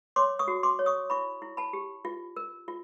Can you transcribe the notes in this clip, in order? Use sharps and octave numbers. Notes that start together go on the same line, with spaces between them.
C#5 C6 D6
C#6 D#6
F#4
C6 D6
C#5
C#6 D#6
E4 B5 C#6
E4
A5 B5
G4
F4
A#4
F4